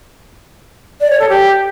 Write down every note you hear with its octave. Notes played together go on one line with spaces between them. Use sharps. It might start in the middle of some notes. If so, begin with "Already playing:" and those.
D5
C#5
A4
G4